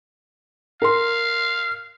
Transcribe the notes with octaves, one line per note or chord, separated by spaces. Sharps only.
A#4 F5 C6